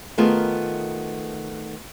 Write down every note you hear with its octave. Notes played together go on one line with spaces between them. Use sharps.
D#3 A3 B3 F4 G#4 A#4